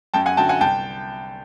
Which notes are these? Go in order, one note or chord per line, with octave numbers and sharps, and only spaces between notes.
F#2 G5 A5
F#5 G#5
D3 F#3 G5 A5
F#5 G#5
C2 G5 A5